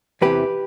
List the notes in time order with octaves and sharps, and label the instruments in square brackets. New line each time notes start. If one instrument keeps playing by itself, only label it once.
[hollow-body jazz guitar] E2 C3 E3 G4 B4